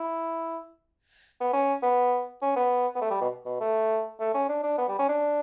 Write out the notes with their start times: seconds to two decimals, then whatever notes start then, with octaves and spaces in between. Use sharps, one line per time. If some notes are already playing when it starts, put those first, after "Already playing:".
Already playing: E4
1.41 B3
1.53 C#4
1.83 B3
2.42 C#4
2.56 B3
2.95 B3
3.01 A3
3.11 G3
3.21 B2
3.45 B2
3.60 A3
4.20 A3
4.34 C#4
4.49 D4
4.63 D4
4.78 B3
4.88 G3
4.99 C#4
5.09 D4